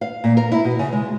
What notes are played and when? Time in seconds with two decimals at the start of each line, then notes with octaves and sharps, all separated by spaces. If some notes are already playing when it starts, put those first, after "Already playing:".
0.01 F5
0.24 A#2
0.37 A#4
0.52 E4
0.64 B2
0.79 C#3
0.93 G#3